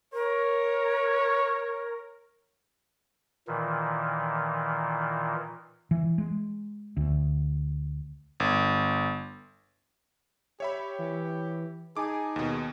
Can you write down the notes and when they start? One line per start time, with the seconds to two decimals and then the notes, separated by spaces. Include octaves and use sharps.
0.13 A#4 C#5
3.47 A#2 D#3 E3
5.91 E3
6.18 G#3
6.97 D2
8.40 G1
10.60 G4 C#5 E5 B5
10.99 E3
11.97 D#4 G#4 G#5 A5 D6
12.36 D#2 B2